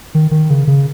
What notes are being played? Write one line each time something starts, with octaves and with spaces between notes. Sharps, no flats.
D#3
D#3
C#3
C#3